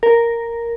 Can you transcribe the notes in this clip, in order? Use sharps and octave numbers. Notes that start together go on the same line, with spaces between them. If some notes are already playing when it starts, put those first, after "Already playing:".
A#4